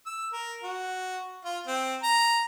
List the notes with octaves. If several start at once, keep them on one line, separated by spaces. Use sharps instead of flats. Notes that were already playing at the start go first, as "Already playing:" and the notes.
E6
A#4
F#4
F4
C4
A#5